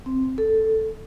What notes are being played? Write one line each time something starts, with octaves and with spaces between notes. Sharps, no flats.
C4
A4